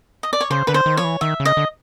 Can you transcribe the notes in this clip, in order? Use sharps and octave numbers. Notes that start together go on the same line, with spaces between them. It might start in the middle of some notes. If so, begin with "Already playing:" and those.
D#5
D5
C#5
C#3 C5
D3 B4
C5
D#3
F3 C#5
E3
D#3 E5
C#3
D#5
D3